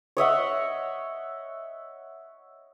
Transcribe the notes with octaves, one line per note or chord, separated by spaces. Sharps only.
C#5 D#5 E5 F#5